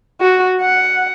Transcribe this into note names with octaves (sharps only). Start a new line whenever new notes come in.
F#4
F#5